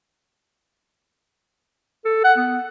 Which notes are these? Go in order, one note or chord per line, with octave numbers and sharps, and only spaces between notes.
A4
F#5
B3